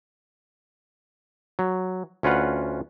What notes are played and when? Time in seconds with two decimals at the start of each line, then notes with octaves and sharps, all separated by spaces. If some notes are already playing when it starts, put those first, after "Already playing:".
1.59 F#3
2.23 D2 C#4 F4 B4 F#5